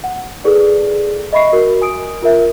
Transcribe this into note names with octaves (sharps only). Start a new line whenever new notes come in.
F#5
E4 G#4 A4 B4 D5
D#5 E5 B5 C#6 C7
F#4 A#4
G#5 D#6 D7
F4 A#4 E5